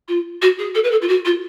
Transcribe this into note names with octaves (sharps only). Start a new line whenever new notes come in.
F4
F#4
G#4
A4
B4
A4
F4
F#4
F4